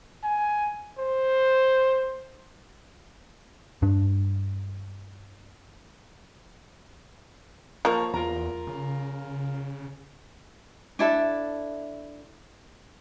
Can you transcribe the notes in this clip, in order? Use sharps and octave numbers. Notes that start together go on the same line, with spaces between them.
G#5
C5
G2 D4
F3 A#3 C#5 A5 A#5
E2 F4 A#4 A#5
C#3
D4 E4 A4 E5